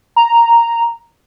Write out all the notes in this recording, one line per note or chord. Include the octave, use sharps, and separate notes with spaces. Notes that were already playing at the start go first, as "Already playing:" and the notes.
A#5